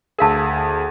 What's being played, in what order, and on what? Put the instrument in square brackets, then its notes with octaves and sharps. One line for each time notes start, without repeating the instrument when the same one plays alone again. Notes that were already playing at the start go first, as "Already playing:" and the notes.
[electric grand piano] D2 G#4 [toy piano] A#4 F5 A5